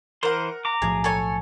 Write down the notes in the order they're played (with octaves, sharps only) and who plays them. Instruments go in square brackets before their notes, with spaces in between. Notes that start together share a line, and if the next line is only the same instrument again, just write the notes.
[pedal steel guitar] E3 C5 C6 [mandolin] A#4 F#5
[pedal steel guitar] A#5 D6
[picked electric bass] B1 A2 F3 [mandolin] G#4
[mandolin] A4 C#5 G#5